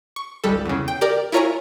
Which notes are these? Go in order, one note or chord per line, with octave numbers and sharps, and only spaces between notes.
C#6
G#1 C#2 G3 A4
E2 C#3
G5
G4 A#4 D5
E4 F4 A#4 C#5 G#5 A#5